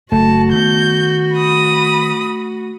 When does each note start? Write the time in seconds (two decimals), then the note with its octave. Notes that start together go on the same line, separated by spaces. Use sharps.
0.12 F#1 A3 F#4 A5
0.53 D#3 B3 G6
1.35 B5 D#6